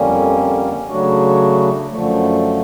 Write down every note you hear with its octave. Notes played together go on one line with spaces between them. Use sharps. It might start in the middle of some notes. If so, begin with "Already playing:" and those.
Already playing: F2 D3 G3 A#3 C#4
C#3 F#3 A3 D4 F#4
F#2 D3 F3 A3